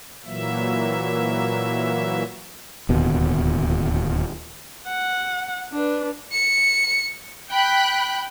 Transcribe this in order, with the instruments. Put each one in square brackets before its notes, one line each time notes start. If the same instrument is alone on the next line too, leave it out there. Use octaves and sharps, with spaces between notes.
[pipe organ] A#2 E3 F#3 A#3 E5
[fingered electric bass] D1 D#2 B2
[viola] F#5
D4 B4
[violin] C#7
[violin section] G5 B5 F#6